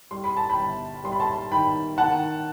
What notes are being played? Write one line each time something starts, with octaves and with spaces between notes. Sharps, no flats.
G3 C6
B5
A5
G5 B5
G1
G3 C6
B5
A5 C6
D#3 G5 B5
D#3 F#5 A5